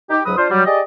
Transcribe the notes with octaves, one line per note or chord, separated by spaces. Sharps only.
D#4 G4
C#2 G#2 F#3 B4 D#6
D4 F4 C5
F#3 G3
G4 G#4 D5 D#5